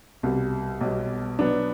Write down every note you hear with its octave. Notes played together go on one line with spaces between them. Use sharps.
C2 B2 G3
B1 B2 G3
B2 F#3 B3 D4